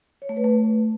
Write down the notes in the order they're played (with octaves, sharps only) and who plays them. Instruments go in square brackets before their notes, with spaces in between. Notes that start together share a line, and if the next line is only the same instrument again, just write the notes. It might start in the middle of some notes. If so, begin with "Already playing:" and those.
[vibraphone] C#5
A3
B4
A3